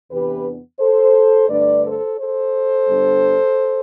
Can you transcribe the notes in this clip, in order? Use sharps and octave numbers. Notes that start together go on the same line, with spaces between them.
E2 C3 E3 B3 D4 G4 B4
A4 C5
G2 D3 A3 D4 B4 D5
A4 C5
A4 C5
G2 D3 G3 B3 D4